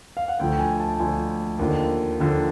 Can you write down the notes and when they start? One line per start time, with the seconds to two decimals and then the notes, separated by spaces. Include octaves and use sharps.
0.17 F5
0.28 F#5
0.39 D2 D3 F3 G5
0.59 G#5
0.80 A5
1.00 D2 D3 F3 G#5
1.59 D#2 D3 F3
2.20 D#2 D3 F3